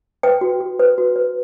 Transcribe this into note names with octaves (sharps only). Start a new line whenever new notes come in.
B4 G5
F#4
F#4
B4
F#4
B4